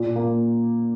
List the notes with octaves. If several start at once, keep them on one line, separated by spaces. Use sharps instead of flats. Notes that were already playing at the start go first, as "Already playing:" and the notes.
Already playing: A#2
A#3